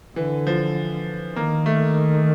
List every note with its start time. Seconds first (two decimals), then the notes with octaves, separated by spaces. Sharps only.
0.16 D3 E3
0.47 F3
1.36 D#3 A#3
1.66 A3